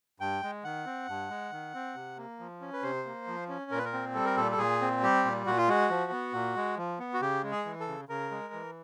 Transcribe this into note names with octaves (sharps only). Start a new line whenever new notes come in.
G2 G5
G#3
D#3 F#5
C4
G2
G#3
D#3
C4
C3
A#3
F3
C#4
B4
C3 C5
A#3
F3
C#4
A#2 A#4
B4
A#4
C4
G3 A4
A#4
A#2 A4
A4
A#2 G#4
C4
G3 G4
A#2
A#2 F#4
F4
G#3 F#4
F3
B3
A#2
G#3
F3
B3
F#4
C#3 G4
G#3
G#4
E3
A4
C#3
C#3 A#4
G#3
E3